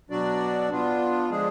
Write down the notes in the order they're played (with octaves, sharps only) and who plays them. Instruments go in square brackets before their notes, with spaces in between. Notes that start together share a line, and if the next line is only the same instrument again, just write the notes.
[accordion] B2 F#3 D4 F#4 D5
B3 D4 F4
D3 F3 G#3 D4 G#4